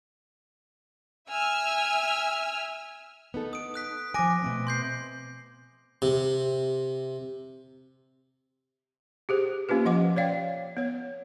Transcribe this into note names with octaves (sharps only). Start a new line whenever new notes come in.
E5 G#5 E6 F6
B3 D#4 A4
D#6 D7
D#6 F#6 B6
F3 G#5 D6 A#6 D7
B2 A3 C4
C6 G6 C7
C3
G4 G#4 C5
A#3 C#4 F4 G4 B4
F3 D#5 F#5 D6
C#5 D5 F5 G5
B3 C#5